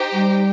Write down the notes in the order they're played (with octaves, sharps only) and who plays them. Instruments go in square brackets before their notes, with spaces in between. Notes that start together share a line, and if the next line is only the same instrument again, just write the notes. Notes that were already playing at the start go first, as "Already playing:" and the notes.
Already playing: [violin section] D#4 G4 C5 G5
[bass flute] G3